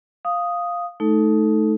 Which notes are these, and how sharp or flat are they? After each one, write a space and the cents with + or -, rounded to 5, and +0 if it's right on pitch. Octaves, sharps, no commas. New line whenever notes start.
F5 +0 D#6 +0
A3 -20 D#4 +10 A4 +0